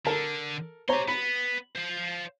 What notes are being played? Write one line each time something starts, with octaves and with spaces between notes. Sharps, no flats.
D3 A4 A#4 A5
G4 C5 C#5 A#5 C6
B3 B5
C5 F5